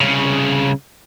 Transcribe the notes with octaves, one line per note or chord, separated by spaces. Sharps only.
C2 C#3